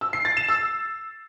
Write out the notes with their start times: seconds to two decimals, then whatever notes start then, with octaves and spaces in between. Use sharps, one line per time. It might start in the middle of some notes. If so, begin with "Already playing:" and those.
0.01 E6
0.13 C7
0.25 A6
0.37 E7
0.49 E6